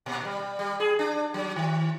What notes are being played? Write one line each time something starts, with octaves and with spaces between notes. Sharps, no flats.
A#2
G3
G3
G#4
D4
F#3
D#3